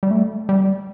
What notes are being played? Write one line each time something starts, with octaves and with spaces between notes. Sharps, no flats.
G3
A3
G3